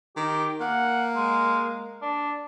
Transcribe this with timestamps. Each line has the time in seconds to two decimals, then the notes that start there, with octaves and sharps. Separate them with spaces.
0.17 D#3 G4
0.61 A#3 F#5
1.16 G#3
2.02 D4